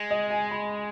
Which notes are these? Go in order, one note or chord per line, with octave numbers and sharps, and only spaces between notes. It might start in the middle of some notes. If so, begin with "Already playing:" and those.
Already playing: G#3
D#5
G#5
B5